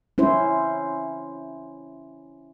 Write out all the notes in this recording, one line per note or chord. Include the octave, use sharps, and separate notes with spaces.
C#4 E4 C5